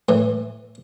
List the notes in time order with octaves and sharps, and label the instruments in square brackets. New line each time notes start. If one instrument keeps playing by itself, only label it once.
[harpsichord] A2 E3